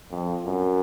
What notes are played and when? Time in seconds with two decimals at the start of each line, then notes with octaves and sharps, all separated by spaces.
0.11 F2
0.46 F#2